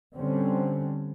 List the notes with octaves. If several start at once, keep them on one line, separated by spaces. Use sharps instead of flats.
D3 G3 C4 C#4